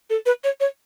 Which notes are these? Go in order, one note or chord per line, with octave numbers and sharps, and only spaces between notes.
A4
B4
C#5
C#5